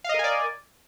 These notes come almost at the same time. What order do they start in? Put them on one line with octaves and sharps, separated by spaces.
F5 D#5 A#4 G#5 D5